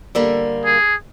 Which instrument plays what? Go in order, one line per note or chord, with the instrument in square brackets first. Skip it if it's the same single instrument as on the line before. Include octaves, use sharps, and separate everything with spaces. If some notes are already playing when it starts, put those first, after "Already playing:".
[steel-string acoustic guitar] D3 G3 A#3
[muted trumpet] G#4